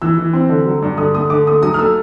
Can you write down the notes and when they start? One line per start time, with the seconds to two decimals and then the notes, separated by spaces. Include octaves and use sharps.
0.02 E3 E6
0.18 E3
0.33 C4
0.49 D3
0.65 F#3
0.83 G2
0.98 D3 D#6
1.15 A3 D#6
1.30 D3 D6
1.47 A3 D#6
1.63 F#3 D#6
1.74 F6
1.79 A3 E6